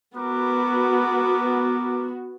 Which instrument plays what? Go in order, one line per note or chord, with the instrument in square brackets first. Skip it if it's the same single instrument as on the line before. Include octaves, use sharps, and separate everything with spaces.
[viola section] B3 F#4 [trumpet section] A#4 B4 D6